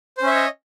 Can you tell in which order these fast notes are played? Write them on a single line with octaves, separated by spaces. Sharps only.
C5 C#4 E5 C#5 D#5